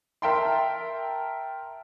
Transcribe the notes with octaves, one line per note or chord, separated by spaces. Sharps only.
A#4 E5 G5 A5 C6